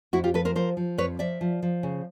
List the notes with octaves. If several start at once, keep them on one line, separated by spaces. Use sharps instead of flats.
F2 E4 F#4
F4 G4
F3 A4 B4
A#4 C5
F3 A#4 C5
F3
F2 B4 C#5
F3 D5 E5
F3
F3
C#3